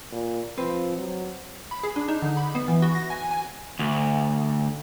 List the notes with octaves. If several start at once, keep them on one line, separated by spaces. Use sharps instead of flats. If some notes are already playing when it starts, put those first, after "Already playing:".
A#2
F3 C4 B4 C5
F#3
B5
G#4
D4
D#4
D3
B5
B3
E3
F#4
A#6
G#5
G#5
D2